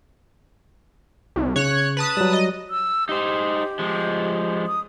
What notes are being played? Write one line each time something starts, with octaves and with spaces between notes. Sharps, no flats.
C2
C#3 C#5 F#6
B4 A5 D#6
F#3 G3
D#5
E6
D#4 G4 C5
F3 G#3
D#6